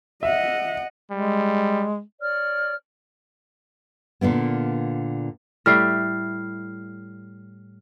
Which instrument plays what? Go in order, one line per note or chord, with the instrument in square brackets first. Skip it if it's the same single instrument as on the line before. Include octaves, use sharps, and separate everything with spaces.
[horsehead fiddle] D#5 F#5 [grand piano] E5
[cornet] G3 [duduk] G#3
[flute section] C#5 D5 F6
[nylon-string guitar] A#2 D3 A#3 B3
[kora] A2 G3 E5 [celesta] F6 C7